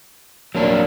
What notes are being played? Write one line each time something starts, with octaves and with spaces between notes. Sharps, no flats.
F#3 A#3 D4